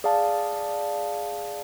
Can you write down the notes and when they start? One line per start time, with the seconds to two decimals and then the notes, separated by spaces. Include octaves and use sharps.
0.04 G#4 D5 F5 A5